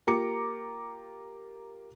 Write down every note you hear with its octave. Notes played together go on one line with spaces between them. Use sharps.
A#3 F4 G4 A#5 D6 C#7